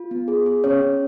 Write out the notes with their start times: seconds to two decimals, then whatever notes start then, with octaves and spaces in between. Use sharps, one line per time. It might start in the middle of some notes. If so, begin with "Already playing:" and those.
Already playing: F4
0.11 B3
0.28 G#4
0.46 G#4
0.64 C#4 C#5
0.82 C#4